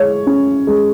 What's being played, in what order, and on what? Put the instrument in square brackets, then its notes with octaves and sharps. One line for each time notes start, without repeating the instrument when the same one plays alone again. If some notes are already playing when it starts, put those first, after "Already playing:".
Already playing: [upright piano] G#3 [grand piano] C#5
[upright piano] C#4
G#3